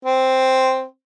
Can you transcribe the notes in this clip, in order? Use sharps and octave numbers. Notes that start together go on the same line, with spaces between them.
C4